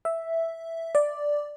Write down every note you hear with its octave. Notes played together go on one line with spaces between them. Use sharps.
E5
D5